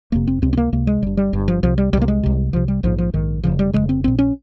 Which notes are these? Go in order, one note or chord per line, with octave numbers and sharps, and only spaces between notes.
F1 F2 C3 A#3
C4
C#2 C3 C4
C4
A#3
C#2 C3 A#3
G#3
G1 G2 G3
G3
G1 G2
F3
C2 C3 F3
G3
C2 C3 G3 A#3
G#3
C2 C3
C2 C3 F3
G3
A#1 G#2 F3
F3
A#1 G#2 D#3
F1 D#2 C#3 F3
G3
F1 D#2 C#3 G#3
C4
A#1 A#2 C4
C#4